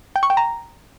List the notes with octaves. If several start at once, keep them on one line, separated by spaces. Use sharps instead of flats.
G5
C#6
G5
A#5